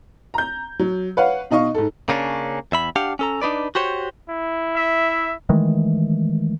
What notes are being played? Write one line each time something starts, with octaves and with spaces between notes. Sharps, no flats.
A#5 G6
F#3
B4 C#5 F5 F#5
B2 D#4 D#5 F5 C#6
G#2 A4
C#3 A#3 C#4 D4
E2 E5 B5
D4 G4 F5 F#5
C#4 A4 A#5
D4 D#4 B4 D5
F#4 G4 C5 C#5
E4
E5
D#3 E3 G#3 A3